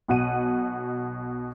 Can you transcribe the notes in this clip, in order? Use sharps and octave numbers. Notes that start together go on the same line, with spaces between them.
B1 B2 F#5 D#7